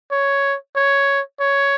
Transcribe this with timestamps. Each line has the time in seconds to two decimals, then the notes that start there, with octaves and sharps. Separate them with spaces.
0.11 C#5
0.76 C#5
1.40 C#5